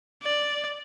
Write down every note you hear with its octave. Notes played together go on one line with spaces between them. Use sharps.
D5